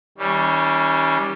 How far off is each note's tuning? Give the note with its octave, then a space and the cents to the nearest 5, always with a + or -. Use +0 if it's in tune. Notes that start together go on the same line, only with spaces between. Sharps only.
D#3 +45 G3 +0 C#4 +0